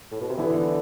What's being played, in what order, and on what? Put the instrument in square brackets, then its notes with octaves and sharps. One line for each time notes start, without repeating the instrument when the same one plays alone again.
[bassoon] A2
B2
C3
[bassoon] D3 [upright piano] E3 B3 E4